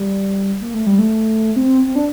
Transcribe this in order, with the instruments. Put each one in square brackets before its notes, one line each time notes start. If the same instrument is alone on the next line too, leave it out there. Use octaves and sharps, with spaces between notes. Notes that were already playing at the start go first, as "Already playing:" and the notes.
Already playing: [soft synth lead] G3
A#3
A3
G3
A3
C4
C4
D4